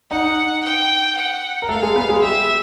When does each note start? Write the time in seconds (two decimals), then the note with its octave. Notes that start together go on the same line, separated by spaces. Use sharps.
0.11 D#4 D#5 F#5
0.64 G5
1.17 F#5
1.62 A#4
1.69 A3 A4 F5
1.82 G#3 G#4
1.96 B3 B4
2.09 G#3 G#4
2.22 G3 G4 E5